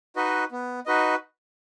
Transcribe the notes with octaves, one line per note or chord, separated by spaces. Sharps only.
D#4 F#4 B4 D#5
B3
D#4 F#4 B4 D#5